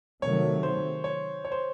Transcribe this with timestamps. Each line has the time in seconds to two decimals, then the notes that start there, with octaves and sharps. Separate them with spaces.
0.22 C3 D#3 F#3 A3 C#5
0.63 C5
1.04 C#5
1.45 C#5
1.52 C5